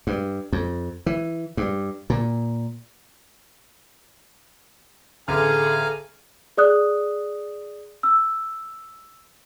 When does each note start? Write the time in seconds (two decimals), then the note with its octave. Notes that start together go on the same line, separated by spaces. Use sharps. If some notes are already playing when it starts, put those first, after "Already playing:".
0.07 G2
0.53 F2
1.06 E3
1.57 G2
2.10 A#2
5.28 A1 D3 G#4 A4 F5 G#5 A#5 F6
6.57 G#4 D5 D#6 F#6
8.03 E6